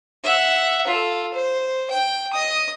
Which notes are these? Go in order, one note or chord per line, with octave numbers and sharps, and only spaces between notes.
E5 F#5
F4 A4
C5
G5
D#5 D#6